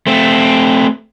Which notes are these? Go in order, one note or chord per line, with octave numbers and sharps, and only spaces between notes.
A3 C4